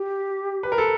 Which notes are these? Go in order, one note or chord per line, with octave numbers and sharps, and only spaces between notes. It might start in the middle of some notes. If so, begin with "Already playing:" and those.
Already playing: G4
B4
A#4
A4